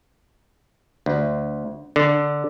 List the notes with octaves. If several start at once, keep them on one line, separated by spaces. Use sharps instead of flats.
D2
D3